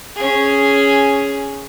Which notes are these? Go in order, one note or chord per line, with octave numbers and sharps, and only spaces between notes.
C#4 G#4